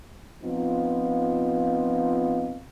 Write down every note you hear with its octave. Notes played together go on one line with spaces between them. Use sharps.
F3 B3 C4 D#4 F4